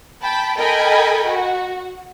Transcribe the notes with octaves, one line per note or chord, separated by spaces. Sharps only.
G5 A5 B5
A4 A#4 D#5 G5 G#5 B5
F#4